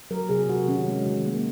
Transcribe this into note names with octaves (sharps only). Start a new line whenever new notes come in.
F#3 A#4
C3 G#4
C3 F#4
D#3 C#4
G#3
D#3
A#3